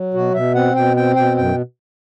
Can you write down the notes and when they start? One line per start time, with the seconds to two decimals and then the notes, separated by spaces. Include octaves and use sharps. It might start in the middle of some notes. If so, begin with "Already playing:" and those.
Already playing: F#3
0.14 B2 F#4
0.34 B2 E5
0.55 C4 F#5
0.75 B2 G5
0.96 C4 G5
1.16 B2 G5
1.37 F#2 G5